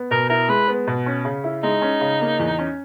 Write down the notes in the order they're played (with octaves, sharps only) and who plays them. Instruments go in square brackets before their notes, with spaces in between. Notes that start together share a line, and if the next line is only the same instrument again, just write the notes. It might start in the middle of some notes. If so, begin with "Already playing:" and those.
Already playing: [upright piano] B3
[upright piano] B2 [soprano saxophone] A#4
[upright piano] E4 [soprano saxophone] A#4
[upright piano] G#3 [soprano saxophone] B4
[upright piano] B3
B2
C#4
C#3
E4
[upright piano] G#3 [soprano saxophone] D#4
[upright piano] C#4
C#3
A#3
E2
C#4